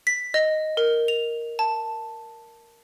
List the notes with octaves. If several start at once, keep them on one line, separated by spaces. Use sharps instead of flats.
B6
D#5
A#4
F7
A5